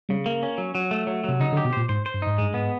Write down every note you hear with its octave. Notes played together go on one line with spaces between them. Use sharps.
C#3 G3
A#3
C#4
F#3
F#3
A3
F#3
C3 F#3
C#3 D#4
D3
G4
B2
A#2 C5
G#2 C5
C5
G2
G#2 D#4
G2 G#3
G#2 B3